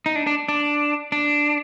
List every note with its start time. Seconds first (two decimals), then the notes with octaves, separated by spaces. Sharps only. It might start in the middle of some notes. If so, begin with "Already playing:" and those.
0.06 D#4
0.16 D4
0.27 D4
0.49 D4
1.12 D4